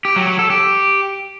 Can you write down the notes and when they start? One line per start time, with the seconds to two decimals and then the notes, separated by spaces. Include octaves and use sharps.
0.05 G4
0.16 F#3
0.27 F#3
0.39 A4
0.50 G4